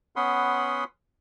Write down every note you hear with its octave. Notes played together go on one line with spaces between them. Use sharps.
B3 C#4 F#5 B5 C6 D#6